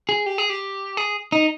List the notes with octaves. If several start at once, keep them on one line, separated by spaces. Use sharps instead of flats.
G#4
G4
G#4
G4
G#4
D#4